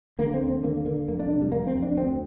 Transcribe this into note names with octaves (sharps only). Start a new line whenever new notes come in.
D3 A#3
C4
D#2
C4
D3 A#3
D3 A#3
F2 A#3
D4
C3 D4
G3
F2 A#3
C4
F2
D4
D2 C4